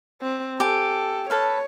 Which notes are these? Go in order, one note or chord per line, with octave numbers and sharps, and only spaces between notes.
C4
G4 A4 G#5
A4 B4 C#5 F5